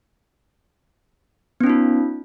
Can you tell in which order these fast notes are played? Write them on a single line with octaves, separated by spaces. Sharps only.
B3 C#4 D#4 F4